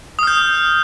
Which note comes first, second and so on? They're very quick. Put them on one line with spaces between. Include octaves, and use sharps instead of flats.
D#6 F6 G6